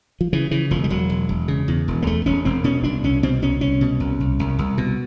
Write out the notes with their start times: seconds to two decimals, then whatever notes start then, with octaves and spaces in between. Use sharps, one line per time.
0.21 F3
0.33 C#3 E3
0.51 C#3 E3
0.71 E1 F3
0.84 G3
0.90 E1 F#3
1.09 E1
1.29 E1
1.48 C#3
1.68 E2
1.88 E1
2.02 A#3
2.07 E2 A3
2.26 E1 C#4
2.45 E1 C4
2.64 B2 C#4
2.84 C2 D4
3.04 C2 C#4
3.23 B2 C4
3.42 C2 C#4
3.61 C2 C#4
3.81 B2
4.00 C2
4.20 C2
4.39 C2
4.59 C2
4.78 B2